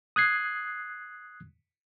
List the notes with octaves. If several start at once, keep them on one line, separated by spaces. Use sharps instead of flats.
D#6 F#6 G#6 C7